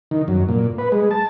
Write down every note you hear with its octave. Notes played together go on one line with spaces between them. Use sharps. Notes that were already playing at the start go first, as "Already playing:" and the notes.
D#3
F#2
A#2
B4
G#3
A5